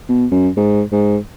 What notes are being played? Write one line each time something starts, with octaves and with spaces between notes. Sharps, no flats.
B2
F#2
G#2
G#2